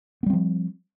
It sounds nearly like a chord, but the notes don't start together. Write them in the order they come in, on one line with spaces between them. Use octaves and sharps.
B3 G3 C4 F3